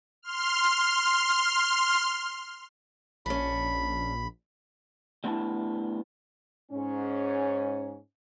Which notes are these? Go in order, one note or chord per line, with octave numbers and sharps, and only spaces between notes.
C6 F6
A#1 C#4 D4 B5
G3 A3 B3 D4 E4 A5
G#2 C#4